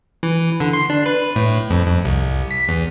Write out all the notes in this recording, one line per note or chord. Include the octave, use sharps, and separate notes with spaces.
E3
D3
C6
D4
B4
A2
F2
F2
C2
B6
E2